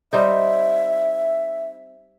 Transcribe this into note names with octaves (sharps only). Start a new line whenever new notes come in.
G3 C4 D#4 E5